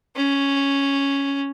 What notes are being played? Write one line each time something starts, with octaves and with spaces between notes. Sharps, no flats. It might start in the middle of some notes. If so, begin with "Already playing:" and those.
C#4